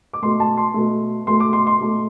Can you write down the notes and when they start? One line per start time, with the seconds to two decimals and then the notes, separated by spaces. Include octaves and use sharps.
0.13 D6
0.23 B2 A3 C6
0.40 A5
0.57 C6
0.74 B2 A3
1.27 B2 A3 C6
1.40 D6
1.53 C6
1.67 C6
1.80 B2 A3